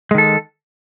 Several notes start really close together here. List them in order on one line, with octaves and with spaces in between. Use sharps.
G#3 D#3 A4